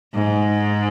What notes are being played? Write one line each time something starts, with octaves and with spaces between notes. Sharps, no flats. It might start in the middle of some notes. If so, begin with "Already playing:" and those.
G#2